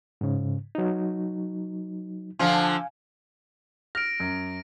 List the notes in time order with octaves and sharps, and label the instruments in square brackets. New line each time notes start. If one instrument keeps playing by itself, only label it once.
[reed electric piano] G#2 C#3
F#3 D#4
[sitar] D3 F3 F4 [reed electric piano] F5 G#5
[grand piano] F6 [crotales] A#6 D7
[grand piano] F#2